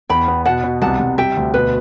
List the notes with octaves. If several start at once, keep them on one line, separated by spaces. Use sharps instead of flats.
E2 G5 B5
B3
B2 F#5 A5
B2
C2 F#5 A5
C2
G3 E5 G5
D2
B2 B4